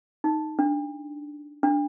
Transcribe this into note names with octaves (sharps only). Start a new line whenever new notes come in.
D#4
D4
D4